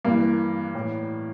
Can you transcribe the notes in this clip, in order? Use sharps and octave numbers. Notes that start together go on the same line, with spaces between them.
G2 E3 A#3
A2 E3